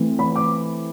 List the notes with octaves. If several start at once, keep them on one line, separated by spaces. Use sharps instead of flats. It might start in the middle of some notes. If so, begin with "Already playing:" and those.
Already playing: E3 A3 C4
B5
D6